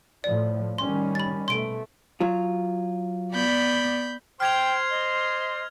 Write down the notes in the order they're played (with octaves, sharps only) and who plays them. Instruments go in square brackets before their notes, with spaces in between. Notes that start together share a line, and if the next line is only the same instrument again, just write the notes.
[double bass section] A2 F3 [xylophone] D5
[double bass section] D#3 G3 C#4 [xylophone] C6
[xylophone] B5 A6
[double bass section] B2 A3 [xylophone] C6 D7
[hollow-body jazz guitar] F#3 F4
[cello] B3 D5 [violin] B5 G6
[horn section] C5 C6 [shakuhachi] G5 [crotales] F6 G#6 F7
[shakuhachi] D#5